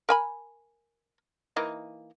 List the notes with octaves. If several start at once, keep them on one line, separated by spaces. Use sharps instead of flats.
A#4 G#5 B5
E3 A#3 D#4